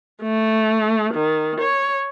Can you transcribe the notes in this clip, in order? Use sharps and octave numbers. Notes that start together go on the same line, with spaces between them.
A3
D#3
C#5